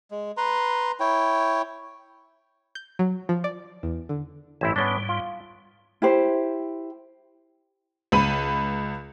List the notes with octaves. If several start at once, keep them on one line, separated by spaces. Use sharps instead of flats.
G#3
B4 A#5 C6
E4 C#5 G5
G6
F#3
F3
D5
E2
D3
A1 G#2 E3 C4 E4
G#2 G3 B3 C#4 D4
F4
E4 G4 C5
C#2 B5 D#7